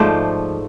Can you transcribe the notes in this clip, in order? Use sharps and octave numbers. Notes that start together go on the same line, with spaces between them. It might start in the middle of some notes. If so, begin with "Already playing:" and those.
Already playing: G#2 F3 A3 C5 D5